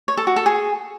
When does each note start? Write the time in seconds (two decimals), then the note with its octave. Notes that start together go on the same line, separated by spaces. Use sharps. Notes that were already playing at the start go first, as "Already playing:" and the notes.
0.08 C#5
0.17 A4
0.27 F#4
0.36 A4
0.46 G#4